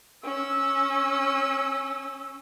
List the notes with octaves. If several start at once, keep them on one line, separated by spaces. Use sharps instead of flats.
C#4 E6